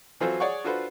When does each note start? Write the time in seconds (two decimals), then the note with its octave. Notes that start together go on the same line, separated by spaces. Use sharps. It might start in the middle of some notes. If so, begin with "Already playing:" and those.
0.20 E3 F#3 C4 F4 A4 C5
0.40 G#4 C#5 D5 F#5 C#6
0.64 D4 F4 F#4 A4 B4 C5